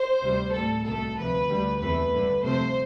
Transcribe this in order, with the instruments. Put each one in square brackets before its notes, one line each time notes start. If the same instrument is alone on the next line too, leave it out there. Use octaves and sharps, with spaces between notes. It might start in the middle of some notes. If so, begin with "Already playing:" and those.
Already playing: [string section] C5
D2 C3 G3
A2 G3 A4
C2 B2 A3 A4
D2 C3 F3 B4
D2 D3 G3
E2 C3 E3 A3 B4
G2 D3 A3
F2 C3 F3 A3 C5